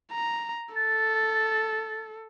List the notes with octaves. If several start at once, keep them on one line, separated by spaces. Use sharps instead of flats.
A#5
A4 A6